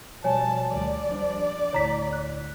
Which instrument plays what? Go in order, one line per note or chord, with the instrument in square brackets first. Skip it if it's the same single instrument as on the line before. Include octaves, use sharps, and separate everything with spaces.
[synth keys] B2 F3 G3 [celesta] C#5 G#5 [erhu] A5
[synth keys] D2 D#3 G3 [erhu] D5
[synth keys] F3 G3 D4
[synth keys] D2 A2 D3 [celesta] C#5 A#5 B6
[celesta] F#6